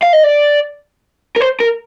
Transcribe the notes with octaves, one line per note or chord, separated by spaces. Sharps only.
F5
D#5
D5
A#4
C5
A#4